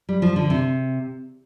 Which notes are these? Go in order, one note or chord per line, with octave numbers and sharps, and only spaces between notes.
G3
F3
D3
C3